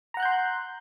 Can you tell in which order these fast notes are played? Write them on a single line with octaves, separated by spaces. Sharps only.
A#5 F#5 F#6 G6 C6